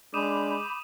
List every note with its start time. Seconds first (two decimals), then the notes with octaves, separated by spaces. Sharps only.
0.14 G#3 D4 B5 D6 D#6 G6 D#7 E7